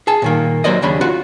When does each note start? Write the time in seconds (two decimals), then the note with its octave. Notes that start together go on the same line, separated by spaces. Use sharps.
0.07 G#4 A5
0.22 A#2 D#3 A#3
0.64 F#3 A#3 C5 D5 D#5
0.82 D#2 C#3 D4 B5
1.01 F4 F#4